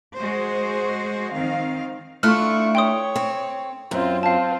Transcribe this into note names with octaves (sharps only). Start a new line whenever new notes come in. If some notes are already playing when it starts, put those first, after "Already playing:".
G#3 F#4 G#4 C5
D#3 C4 F5
A3 D4 E4 F4 A4 C#6 F6 F#6
C#5 G5 C6 D#6
C4
F#2 C4 F4
C4 F4 F5 A5